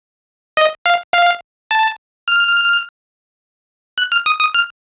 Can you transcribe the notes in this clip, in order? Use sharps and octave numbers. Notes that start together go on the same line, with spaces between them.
D#5
F5
F5
A5
F6
F#6
F6
D#6
D#6
F6